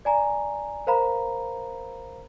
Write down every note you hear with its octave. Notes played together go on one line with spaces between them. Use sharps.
D5 G#5 A#5
A#4 C5 F5 A#5 B5